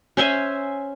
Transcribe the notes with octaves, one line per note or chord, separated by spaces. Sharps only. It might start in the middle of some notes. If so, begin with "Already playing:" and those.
C#4 C5 E5 G#5